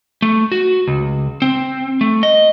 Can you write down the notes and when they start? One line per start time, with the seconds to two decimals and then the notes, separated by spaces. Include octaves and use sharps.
0.22 A3
0.52 F#4
0.88 C#2
1.42 C4
2.01 A3
2.23 D#5